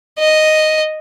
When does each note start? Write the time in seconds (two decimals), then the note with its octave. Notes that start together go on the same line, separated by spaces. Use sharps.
0.19 D#5